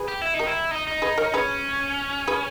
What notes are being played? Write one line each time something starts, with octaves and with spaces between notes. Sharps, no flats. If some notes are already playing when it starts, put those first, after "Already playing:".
Already playing: G#4 B4
G4
E4
D#4
G4 A#4
E4
D#4
D#4
G#4 B4
A#4 C#5
C#4 G#4 B4
G#4 B4